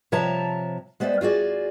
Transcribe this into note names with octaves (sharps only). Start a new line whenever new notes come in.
C3 F3 C#5 E5 A5 A#5
G#3 B3 C5 D5 E5
F4 F#4 G#4 D5